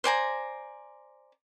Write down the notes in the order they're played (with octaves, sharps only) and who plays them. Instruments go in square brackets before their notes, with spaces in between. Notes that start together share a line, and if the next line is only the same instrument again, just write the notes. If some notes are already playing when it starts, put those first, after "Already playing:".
[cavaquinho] C5 D5 G#5 A#5